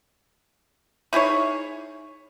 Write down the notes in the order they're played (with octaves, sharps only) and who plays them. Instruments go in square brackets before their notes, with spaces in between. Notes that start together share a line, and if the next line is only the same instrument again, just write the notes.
[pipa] D#4 E4 G#4 C#5